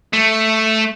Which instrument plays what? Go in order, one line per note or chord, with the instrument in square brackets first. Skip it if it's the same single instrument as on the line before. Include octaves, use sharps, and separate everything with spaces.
[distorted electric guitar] A3